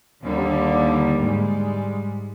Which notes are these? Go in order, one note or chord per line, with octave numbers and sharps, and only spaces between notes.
D#2 D3 G3 A#3
G#2 G3 G#3